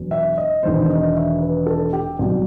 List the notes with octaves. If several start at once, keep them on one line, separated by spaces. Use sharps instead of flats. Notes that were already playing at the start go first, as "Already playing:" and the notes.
Already playing: E1 E2 B2 F#3
E5
D#5
E1 E2 D#3 C5
D#5
E5
B4
A4
G4
C2 B2 F#3